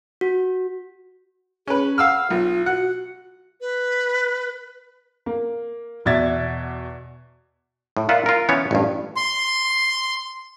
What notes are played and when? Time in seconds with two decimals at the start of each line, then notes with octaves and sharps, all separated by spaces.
0.21 F#4
1.67 C#4 G#4 B4
1.98 F5 F#5 E6 F6
2.30 B1 F4
2.66 F#4 F#5
3.61 B4
5.26 A#3
6.05 E2 B2 D5 E5 G#6 A6
7.97 A2
8.09 A#2 F4 E5 F#5
8.26 F4 A#4
8.49 E3 B3 C#4 C#5
8.71 A1 G2
9.16 C6